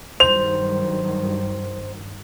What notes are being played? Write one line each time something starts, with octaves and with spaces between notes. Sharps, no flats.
G2 D#3 F#3 C5 F7